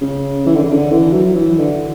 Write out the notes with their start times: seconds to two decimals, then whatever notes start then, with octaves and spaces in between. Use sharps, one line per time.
0.02 C#3
0.46 E3
0.55 D3
0.63 C#3
0.72 D3
0.91 E3
1.13 F#3
1.35 E3
1.59 D3